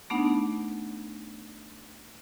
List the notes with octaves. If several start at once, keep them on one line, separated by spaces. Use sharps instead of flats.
A3 B3 D4 D#4 F#5